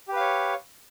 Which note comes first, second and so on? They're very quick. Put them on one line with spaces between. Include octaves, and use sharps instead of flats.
G4 B4 F5 C#5